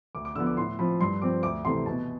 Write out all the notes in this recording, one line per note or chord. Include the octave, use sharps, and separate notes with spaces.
D2 D6
D6
D3 F3 B3 E6
D6
A2 C6
F3 C4 B5
G2 C6
F3 C4 D6
D2 D6
C3 E3 A3 C4 C6
B2 A5